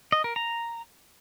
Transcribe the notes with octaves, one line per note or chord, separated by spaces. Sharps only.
D#5
A#4
A#5